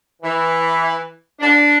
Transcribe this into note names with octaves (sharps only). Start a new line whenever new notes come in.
E3
D4